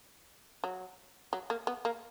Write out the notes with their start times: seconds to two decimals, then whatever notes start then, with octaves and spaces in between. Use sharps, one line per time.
0.64 F#3
1.33 F#3
1.50 A#3
1.67 B3
1.85 A#3